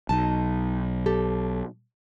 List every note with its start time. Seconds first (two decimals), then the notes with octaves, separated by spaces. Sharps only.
0.09 B1 D#4 A5
1.06 G4 A4